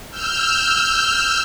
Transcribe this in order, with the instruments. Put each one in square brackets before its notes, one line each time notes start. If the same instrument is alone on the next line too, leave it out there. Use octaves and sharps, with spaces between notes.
[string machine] E6 F6 G6